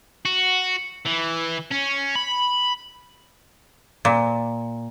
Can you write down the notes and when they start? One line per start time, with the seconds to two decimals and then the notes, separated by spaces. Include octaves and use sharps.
0.25 F#4
1.05 E3
1.71 C#4
2.15 B5
4.05 A#2